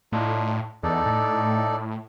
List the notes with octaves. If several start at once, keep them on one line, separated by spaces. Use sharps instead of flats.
A2 D4 D#4 F4
E2 D#4 A4 D5
A2